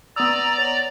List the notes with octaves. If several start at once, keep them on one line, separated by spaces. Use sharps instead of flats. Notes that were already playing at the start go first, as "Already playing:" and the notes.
B3 D5 A#5 D#6 E6
C#5